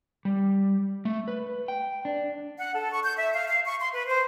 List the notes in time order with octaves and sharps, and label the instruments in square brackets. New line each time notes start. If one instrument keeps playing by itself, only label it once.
[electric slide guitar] G3
A3
B4
G5
D4
[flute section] F#5
A4
C#6
G6
E5
F5
F5
C#6
C6
B4
C5